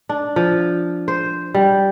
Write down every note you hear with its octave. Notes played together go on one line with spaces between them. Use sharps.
D4
F3
C5
G3